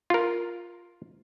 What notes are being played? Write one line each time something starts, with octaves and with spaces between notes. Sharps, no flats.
F4 A#4